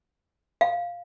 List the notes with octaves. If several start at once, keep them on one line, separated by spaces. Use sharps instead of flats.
F5